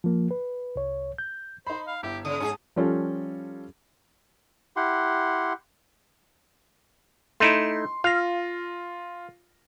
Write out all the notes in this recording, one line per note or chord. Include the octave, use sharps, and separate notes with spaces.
F3 A#3
B4
C2 C#5
G6
D#4 C5 B5
F5
G1 E4 G4
C#3 D#6
G#2 C#4 D#4 G#4 A5
F3 G3 C#4 F4 A4
E4 G4 F#5 C6
A3 D#4 E4 C6
F4 F5 A#6